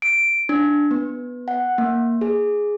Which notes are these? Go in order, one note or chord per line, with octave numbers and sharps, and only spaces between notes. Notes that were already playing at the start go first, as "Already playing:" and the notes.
D7
D4
B3
F#5
A#3
G#4